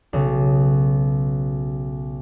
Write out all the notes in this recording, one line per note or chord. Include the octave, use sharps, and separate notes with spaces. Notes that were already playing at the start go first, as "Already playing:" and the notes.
B1 C#3